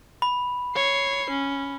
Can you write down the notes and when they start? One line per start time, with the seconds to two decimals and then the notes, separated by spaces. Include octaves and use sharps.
0.22 B5
0.75 C#5 C7
1.30 C#4